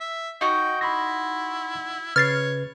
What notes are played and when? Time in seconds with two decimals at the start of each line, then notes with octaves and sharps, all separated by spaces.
0.01 E5
0.41 D#4 F#4 G5
0.81 E4 B5 C6 A#6
2.16 C#3 B4 C#5 F6 G#6 A6 C7